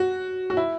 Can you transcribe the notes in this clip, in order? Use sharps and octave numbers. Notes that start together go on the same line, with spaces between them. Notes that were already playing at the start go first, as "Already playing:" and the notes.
Already playing: F#4
F#4
E4